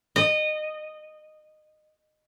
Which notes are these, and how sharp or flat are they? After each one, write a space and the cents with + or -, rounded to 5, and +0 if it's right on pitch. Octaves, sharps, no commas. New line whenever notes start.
D#5 -20